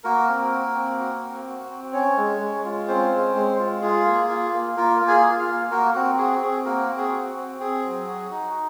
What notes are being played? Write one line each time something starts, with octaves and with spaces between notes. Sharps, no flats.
A#3 F#4 A#4
C4
F#4
C4
F#4
C4
F#4
C4
C#4 C#5
G#3
G#3
F4
C4 C#4 C5
G#3
G#3
F4
F4 G#4
A#3
F4
A#3
A#3 F4 A#4
A#3
G#4 G#5
F4
F4 F5
A#3
A#3 F#4 A#4
C4 F#4
F#4 G#4
F#4
C4 G#4
A#3 F#4 A#4
C4
G#4
F#4
C4
C4 G#4
F#3
F#4
D#4